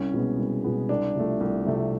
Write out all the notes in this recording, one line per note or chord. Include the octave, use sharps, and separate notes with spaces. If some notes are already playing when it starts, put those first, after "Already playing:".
Already playing: C2 C#4
B2 G#3 B3
C2
B2 G#3 B3
C2 D4
C3 F3 A3
C2
C3 F3 A3